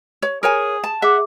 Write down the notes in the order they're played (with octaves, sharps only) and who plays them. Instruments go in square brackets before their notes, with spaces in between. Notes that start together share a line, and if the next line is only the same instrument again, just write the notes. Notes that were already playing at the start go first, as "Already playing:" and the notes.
[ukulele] C#5
[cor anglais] G#4 [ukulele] A#4 C#5 G#5
[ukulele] A5
[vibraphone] G#4 D6 [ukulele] E5 [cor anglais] F#5